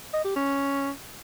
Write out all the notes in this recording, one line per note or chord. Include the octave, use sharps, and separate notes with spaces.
D#5
G4
C#4